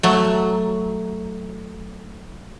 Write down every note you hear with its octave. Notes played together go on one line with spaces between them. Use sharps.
F#3 A3